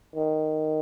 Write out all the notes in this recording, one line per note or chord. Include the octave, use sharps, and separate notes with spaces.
D#3